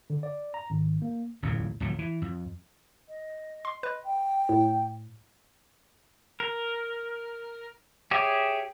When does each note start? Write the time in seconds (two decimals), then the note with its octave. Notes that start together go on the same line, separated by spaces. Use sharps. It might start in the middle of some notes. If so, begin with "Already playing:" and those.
0.10 D3
0.23 D5
0.54 A#5
0.70 G#1
1.02 A#3
1.42 D1 A1 E2 A#2
1.80 D1 F2 G#2 F#3
1.99 E3
2.22 F2
3.09 D#5
3.65 C6
3.83 B4 D#5
4.04 G5
4.49 A2
6.40 A#4
8.11 G4 G#4 C#5 E5